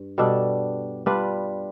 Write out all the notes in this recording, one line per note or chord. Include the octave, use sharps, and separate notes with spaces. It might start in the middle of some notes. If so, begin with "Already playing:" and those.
Already playing: G2
B2 G3 D4 A4
G3 D4 F4 B4